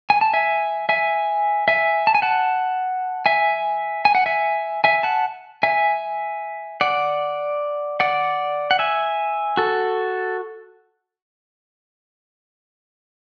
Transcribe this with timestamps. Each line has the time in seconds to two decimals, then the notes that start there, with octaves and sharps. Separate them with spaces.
0.10 G#5
0.21 A5
0.34 E5 G#5
0.89 E5 G#5
1.68 E5 G#5
2.07 A5
2.15 G#5
2.22 F#5 A5
3.26 E5 G#5
4.05 G#5
4.15 F#5
4.26 E5 G#5
4.84 E5 G#5
5.03 F#5 A5
5.63 E5 G#5
6.81 D5 F#5
8.00 D5 F#5
8.71 F#5
8.79 E5 G#5
9.57 F#4 A4